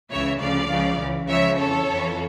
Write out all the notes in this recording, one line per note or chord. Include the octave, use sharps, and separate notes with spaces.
C#2 C#3 E3 C#5 E5
D2 C#3 F3 D5 F5
C#2 C#3 F3
C#2 C#3 E3
C#2 C#3 F3 C#5 E5
F2 E3 A4 C#5
F2 E3